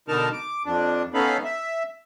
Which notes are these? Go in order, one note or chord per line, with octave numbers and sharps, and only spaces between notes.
B2 D3 D#4 A#4 A5 F6
D6
F2 D4
B3 C#4 D#4 A4 F5 B5
E5